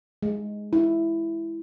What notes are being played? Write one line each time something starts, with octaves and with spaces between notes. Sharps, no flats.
G#3
E4